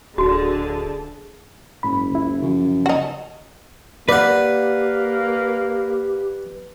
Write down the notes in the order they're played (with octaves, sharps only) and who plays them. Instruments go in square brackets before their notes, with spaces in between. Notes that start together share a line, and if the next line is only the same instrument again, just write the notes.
[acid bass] D1 [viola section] D3 G#4 A5 [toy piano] F#4
[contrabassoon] F#1 [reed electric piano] G#2 B5
[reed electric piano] C#2 E4
[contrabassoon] F#2 [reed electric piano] C#3 F3
[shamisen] D#4 F#4
[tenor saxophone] A#3 [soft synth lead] G4 [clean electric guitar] B4 [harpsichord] D5 F#5